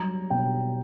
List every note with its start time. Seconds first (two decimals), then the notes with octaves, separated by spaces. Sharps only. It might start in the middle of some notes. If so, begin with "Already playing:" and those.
Already playing: F#3 G3 A#5
0.30 B2 G5